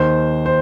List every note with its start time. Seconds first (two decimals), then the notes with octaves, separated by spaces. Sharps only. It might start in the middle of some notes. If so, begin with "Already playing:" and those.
Already playing: D#2 D#3 C5
0.46 C5